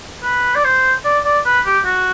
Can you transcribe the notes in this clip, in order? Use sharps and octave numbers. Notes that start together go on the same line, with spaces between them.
B4
D5
C5
D5
D5
B4
G4
F#4